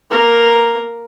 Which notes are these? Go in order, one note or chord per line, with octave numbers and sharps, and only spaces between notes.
A#3 A#4